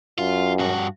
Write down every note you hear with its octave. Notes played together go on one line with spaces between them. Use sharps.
F#2 F4
G2 F#4